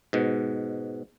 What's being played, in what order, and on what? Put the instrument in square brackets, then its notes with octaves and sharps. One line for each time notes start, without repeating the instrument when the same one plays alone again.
[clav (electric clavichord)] G#2 B2